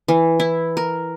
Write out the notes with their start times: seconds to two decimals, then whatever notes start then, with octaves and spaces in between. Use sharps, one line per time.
0.08 E3
0.40 E4
0.77 A#4